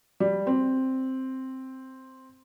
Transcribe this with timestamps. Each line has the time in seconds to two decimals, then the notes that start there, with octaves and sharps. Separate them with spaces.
0.20 G3
0.47 C4